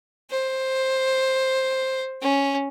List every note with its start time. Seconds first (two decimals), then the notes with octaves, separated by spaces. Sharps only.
0.31 C5
2.21 C#4